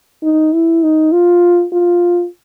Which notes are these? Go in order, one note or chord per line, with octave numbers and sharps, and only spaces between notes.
D#4
E4
D#4
F4
F4